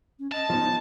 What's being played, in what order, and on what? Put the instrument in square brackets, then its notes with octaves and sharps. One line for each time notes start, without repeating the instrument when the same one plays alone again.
[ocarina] C#4
[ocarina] D#5 [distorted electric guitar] A5
[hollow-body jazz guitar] F3 D#4 [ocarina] B3